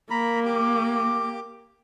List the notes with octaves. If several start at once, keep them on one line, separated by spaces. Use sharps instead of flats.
A#3 A#5 B5
G4 D6